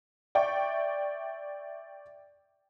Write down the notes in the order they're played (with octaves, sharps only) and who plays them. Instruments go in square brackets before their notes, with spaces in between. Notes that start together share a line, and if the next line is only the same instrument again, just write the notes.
[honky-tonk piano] D5 E5 G5 C#6